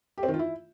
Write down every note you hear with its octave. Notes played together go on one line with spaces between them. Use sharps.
G4
C4
D#3
F4
E4